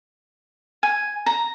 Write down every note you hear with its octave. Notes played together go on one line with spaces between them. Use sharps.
G#5
A#5